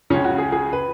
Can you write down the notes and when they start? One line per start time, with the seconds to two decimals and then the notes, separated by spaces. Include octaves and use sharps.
0.10 C#2 C#3 C#4
0.24 F#4
0.38 G#4
0.52 G#4
0.73 B4